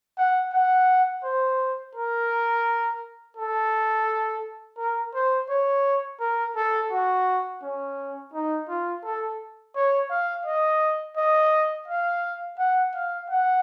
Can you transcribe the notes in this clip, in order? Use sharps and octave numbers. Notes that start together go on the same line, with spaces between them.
F#5
F#5
C5
A#4
A4
A#4
C5
C#5
A#4
A4
F#4
C#4
D#4
F4
A4
C#5
F5
D#5
D#5
F5
F#5
F5
F#5